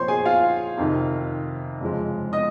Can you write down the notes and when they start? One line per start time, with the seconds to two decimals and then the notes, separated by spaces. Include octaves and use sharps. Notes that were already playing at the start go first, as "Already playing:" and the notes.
Already playing: A#2 F3 C4 C5 C#5 C6
0.08 G#4 G#5
0.25 F4 F5
0.78 F2 C3 D#3
1.81 F2 C#3 F3 G#3
2.33 D#5 D#6